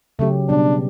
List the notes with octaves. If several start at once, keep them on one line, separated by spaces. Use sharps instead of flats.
C#3 F#3 A3 C#4 G4
B2 G3 B3 D4